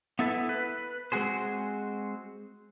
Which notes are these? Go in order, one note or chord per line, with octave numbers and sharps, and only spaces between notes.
B3 E4 A4 B4
B4
G#3 C4 F#4 G#4 C5